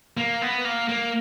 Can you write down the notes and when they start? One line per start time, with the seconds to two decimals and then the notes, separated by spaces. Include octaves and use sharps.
0.17 A#3
0.42 B3
0.65 A#3
0.89 A#3